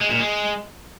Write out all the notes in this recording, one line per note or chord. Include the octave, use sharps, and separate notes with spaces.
G#3
A#2
G#3